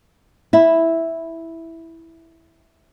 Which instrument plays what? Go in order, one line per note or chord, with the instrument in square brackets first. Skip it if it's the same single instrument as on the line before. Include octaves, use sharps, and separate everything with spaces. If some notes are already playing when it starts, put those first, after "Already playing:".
[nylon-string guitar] E4 E5